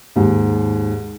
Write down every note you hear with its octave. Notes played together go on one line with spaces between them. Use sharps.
D#2 G#2